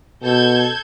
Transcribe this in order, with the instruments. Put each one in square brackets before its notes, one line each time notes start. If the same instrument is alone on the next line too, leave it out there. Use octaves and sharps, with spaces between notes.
[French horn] B2 [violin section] A4 G6 G#6